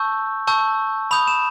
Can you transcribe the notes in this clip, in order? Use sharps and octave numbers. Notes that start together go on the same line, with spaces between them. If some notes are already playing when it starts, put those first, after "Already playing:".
Already playing: A5 C#6 E6 G6
A5 C#6 E6 G6
B5 D#6 G6 F7
E7